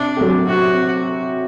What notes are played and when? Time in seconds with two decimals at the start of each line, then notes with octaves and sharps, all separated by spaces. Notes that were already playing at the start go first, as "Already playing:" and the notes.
Already playing: C3 D4
0.17 F#3 C4 G4
0.47 C3 F#4